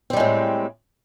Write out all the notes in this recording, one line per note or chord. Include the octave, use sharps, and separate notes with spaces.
A2 G3 G#3 C4